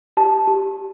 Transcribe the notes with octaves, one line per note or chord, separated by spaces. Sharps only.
G4 A5
G4